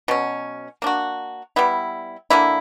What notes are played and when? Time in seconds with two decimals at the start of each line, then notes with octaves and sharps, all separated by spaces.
0.08 B2 F#3 C#4
0.82 A#3 D4 F#4
1.56 G3 B3 E4
2.30 D3 A#3 E4